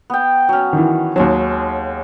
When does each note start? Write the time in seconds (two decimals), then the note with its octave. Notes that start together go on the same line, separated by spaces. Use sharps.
0.10 B3 G5
0.49 F#3 C#4
0.73 D#3 E3
1.16 D#2 F#3 G#3 A5